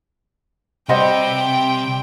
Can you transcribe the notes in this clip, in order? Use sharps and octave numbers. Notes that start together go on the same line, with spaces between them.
C3 G3 C4 C5 D#5 F#5 G5